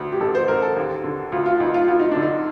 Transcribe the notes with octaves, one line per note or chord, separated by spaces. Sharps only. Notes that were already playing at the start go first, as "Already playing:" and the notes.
Already playing: D2
G4
A1 A4
C5
A1 A#4
A4
D#2
D3
D2 F4
F4
D2 D#4
F4
D2 F4
D#4
D3 D4
D#4